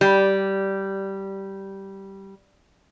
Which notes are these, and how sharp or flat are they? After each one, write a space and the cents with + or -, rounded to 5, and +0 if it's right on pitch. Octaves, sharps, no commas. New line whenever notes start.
G3 -10